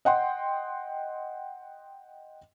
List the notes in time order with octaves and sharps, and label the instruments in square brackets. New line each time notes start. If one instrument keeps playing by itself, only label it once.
[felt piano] D#5 F#5 G5 C6